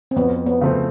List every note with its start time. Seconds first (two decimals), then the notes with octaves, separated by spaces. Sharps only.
0.11 C4
0.16 F2 B3
0.46 B3
0.61 C#3 F3 A3 C4